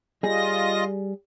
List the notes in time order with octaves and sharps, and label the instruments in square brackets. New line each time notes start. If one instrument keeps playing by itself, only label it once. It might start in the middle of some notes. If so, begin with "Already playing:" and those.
[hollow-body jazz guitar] G3 G#4 [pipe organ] F4 D#5 A#6